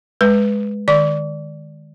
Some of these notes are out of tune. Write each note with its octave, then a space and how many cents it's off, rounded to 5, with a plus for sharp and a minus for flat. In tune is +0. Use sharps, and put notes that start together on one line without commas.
G#3 +0 B4 +0
D#3 -20 D5 +0 D6 -40